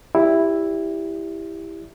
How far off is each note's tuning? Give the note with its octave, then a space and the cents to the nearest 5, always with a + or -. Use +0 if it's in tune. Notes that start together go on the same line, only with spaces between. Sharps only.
E4 +0 G4 +10 D5 -20